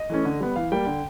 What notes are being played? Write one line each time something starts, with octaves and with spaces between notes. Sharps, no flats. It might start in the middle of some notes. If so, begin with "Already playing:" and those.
Already playing: D#5
E3 A3 C#4
D3
G3 B3
E3 F5
G3 A#3 G5
D3